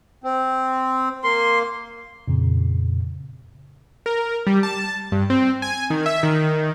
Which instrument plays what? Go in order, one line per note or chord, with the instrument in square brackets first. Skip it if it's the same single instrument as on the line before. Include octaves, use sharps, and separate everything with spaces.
[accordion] C4
[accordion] A#3 [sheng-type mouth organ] C6
[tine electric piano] F2 A#2 C#3
[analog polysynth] A#4
G3
A5
G2
C4
G#5
D#3
E5
D#3